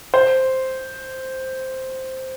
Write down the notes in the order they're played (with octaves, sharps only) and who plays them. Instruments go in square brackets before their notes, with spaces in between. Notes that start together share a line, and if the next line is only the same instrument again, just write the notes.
[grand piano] C5